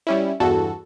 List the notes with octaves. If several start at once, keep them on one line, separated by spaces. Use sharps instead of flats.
G3 C#4 E4
E2 G2 F#4 A4